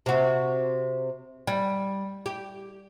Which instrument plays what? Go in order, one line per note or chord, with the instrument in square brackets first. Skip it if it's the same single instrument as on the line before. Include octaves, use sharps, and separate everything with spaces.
[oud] C3 F#4
G3
G4